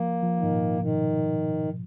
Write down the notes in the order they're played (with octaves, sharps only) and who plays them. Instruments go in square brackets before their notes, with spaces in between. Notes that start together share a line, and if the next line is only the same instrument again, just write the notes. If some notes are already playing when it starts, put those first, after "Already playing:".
Already playing: [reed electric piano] F3 [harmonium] A#3
[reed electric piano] F3
[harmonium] D#3
[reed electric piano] G#2
A#2
[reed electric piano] B2 [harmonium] D#3